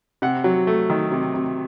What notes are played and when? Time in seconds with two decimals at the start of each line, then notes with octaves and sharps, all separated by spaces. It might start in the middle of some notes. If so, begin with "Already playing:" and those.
0.22 C3 F#5
0.44 F#3
0.67 A3
0.90 D#3
1.12 C3
1.34 C3